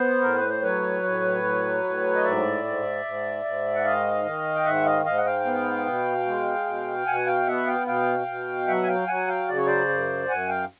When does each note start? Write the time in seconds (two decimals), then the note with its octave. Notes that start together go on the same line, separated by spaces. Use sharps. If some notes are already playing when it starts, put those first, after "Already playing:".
Already playing: B3 C5
0.21 A2 A#4
0.35 B4
0.49 C5
0.62 F#3 B4 C#5
1.03 A2
1.43 F#3
1.84 A2
2.15 D#5
2.24 G#2 D5 E5
2.64 G#2
3.05 G#2
3.45 G#2
3.75 F#5
3.84 D#3 D#5 F5
4.25 D#3
4.55 G5
4.65 G#2 E5 F#5
4.85 D#5 F5
5.05 G#2 D#5 F5
5.17 F#5
5.25 F5 G5
5.45 B3
5.86 B2
6.26 G#3
6.66 B2
7.07 B2 F#5 G#5
7.26 F5 G5
7.47 B3 E5 F#5
7.67 F5 G5
7.87 B2 F5 G5
8.27 B2
8.67 F#3 E5 F#5
8.84 G#5
8.88 F5 G5
9.08 F#3 F#5 G#5
9.28 F5 G5
9.48 C#3 D5
9.57 C#5
9.66 C5 D5
9.89 F#2
10.29 F#2 F#5 G#5
10.49 F5 G5